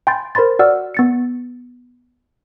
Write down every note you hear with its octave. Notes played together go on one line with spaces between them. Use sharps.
G5 G#5 B5 C6 G6 A6
A#4 C5 B5 C6 A6
F#4 D5 F#5 E6 F6
B3 A6 C#7